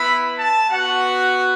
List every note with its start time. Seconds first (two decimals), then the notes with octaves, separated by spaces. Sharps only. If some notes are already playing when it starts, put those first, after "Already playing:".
Already playing: B3 E4 B5
0.38 A5
0.70 B3 F#4 F#5